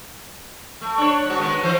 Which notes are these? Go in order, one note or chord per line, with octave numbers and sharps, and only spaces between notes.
A3
D4 C#5
G#2 F#4
D#3 G#3 B3
F2 E3 C5